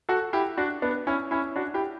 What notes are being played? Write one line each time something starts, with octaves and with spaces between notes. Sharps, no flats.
F#4 A4
E4 G4
D4 F#4
B3 D4
C#4 E4
C#4 E4
D4 F#4
E4 G4